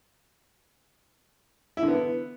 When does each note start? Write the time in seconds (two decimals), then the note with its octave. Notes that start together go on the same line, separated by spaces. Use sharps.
1.77 E4
1.83 D3
1.88 B3